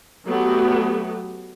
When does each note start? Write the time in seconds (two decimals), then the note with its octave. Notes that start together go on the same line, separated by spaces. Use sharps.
0.24 F#3 A3 B3 F#4 G4